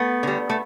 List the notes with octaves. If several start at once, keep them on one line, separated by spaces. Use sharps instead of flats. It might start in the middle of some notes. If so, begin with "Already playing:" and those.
Already playing: A3 B3
D3 G3
A3